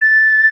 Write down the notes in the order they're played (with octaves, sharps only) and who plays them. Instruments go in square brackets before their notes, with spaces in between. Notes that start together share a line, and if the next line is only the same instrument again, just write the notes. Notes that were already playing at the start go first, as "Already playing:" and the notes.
[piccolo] A6